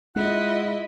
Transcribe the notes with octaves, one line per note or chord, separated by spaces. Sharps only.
G#3 E4 F4 D#5 F#5